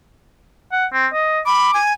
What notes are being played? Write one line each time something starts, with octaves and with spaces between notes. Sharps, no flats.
F#5
C4
D#5
B5 D6
G#5